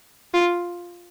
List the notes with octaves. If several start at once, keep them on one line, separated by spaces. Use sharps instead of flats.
F4